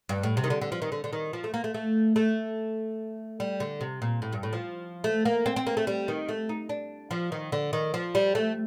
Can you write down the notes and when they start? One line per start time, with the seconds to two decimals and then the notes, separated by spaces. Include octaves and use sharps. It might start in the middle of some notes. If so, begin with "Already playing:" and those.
0.09 G2
0.23 A2
0.37 C3
0.44 D#3
0.50 D3
0.61 D3
0.72 F3
0.82 D#3
0.92 D3
1.04 D3
1.13 D#3
1.33 F3
1.44 A3
1.54 A#3
1.64 A3
1.74 A3
2.16 A3
3.40 G3
3.60 D3
3.81 C3
4.02 A#2
4.22 A2
4.33 G2
4.43 A2
4.53 F3
5.04 A3
5.25 A#3
5.46 C4
5.56 C4
5.67 A#3
5.77 A3
5.87 G3
6.08 D#3
6.29 A3
6.49 D#4
6.69 D4
7.11 F3
7.32 D#3
7.52 D3
7.73 D#3
7.94 F3
8.15 G3
8.35 A3